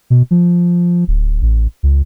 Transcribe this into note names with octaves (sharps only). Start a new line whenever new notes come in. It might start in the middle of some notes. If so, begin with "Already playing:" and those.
B2
F3
D1
A1
C#2